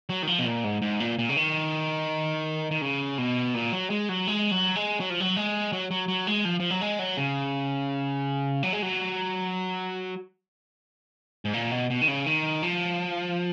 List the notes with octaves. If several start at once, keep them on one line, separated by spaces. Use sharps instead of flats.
F#3
D#3
F3
B2
A#2
G#2
G#2
A#2
A#2
C#3
D#3
D#3
C#3
B2
A#2
F#3
G#3
F#3
G#3
F#3
G#3
F#3
F3
F#3
G#3
F#3
F#3
F#3
G#3
F3
F3
F#3
G#3
F#3
C#3
F#3
G#3
F#3
G#2
A#2
B2
B2
D#3
C#3
D#3
F3